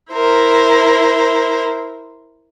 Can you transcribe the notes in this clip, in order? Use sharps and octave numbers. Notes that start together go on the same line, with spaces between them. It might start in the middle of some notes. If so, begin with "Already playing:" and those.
E4 A#4 C5